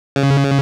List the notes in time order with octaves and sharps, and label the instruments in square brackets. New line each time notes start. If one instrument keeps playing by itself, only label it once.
[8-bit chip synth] C#3